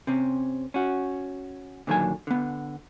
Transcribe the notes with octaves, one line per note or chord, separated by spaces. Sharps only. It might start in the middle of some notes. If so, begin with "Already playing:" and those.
C3 C4 C#4
C#4 F#4
A#2 D3 D#3 F#3 A4 G#5
D3 B3